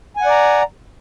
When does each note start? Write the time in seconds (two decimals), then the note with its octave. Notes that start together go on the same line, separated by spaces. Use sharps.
0.17 G#5
0.21 F#5
0.26 D5
0.30 A#5